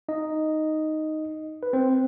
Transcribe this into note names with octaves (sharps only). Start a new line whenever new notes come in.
D#4 D#5
B4
C4 C5